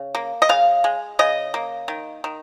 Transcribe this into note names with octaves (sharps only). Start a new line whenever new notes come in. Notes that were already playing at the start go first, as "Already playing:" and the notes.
Already playing: C#3
A#3
D#5
C#3 F5
G#3
C#3 D#5
A#3
D#3
D#3